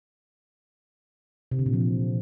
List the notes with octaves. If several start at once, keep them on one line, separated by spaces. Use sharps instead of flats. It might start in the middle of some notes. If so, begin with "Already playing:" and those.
C3
D3
A#2
F3
E3